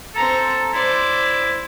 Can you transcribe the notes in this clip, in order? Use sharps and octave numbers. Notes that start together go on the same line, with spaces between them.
C4 A4 A#5
E4 C5 D5